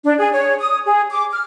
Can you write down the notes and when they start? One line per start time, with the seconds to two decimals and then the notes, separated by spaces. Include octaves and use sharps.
0.04 D4
0.19 G#4
0.32 C#5
0.60 D#6
0.85 G#4
1.11 D6
1.32 F6